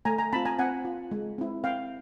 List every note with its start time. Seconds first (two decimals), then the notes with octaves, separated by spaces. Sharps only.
0.05 A3 G#5 A#5
0.18 G#5 A#5
0.33 C4 F4 A5 B5
0.45 G#5 A#5
0.59 C4 F#5 G#5
0.85 F4
1.11 G#3
1.38 C4 E4
1.64 C4 F5 G5